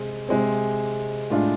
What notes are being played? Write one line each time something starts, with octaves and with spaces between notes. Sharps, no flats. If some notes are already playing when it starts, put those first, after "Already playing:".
Already playing: C3 G#3 C4
C3 G#3 C4
A2 G#3 D4 F4